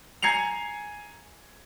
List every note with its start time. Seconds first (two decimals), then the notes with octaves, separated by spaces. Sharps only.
0.22 G#5 A#5 G#6 C7 C#7 F7